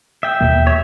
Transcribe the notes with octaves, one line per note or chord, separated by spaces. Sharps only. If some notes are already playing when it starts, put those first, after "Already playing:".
E5 G5
D#2 B2 A#3
C#5 E5